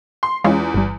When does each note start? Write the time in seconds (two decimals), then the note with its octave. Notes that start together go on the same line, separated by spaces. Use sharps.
0.23 C6
0.44 E2 G#3 C#4 F4
0.74 G1 G3